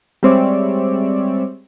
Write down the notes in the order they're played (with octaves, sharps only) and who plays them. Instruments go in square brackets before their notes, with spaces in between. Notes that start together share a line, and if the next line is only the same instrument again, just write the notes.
[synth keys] G3 G#3 C4 C#5 D5 E5